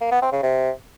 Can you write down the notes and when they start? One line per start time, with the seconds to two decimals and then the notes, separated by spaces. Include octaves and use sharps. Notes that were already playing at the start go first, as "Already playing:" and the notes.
0.01 A#3
0.11 B3
0.22 C4
0.32 C#3
0.43 C3